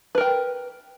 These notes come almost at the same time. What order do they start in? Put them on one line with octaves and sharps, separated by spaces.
B4 A#4 G5